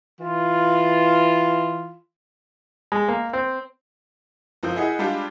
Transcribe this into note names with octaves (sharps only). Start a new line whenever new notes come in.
E3 F4
G#3
A#3
C4
F#1 F3 C4 E6 G6
E4 G#4 D#5 F#5
G3 G#3 D4 F4 G4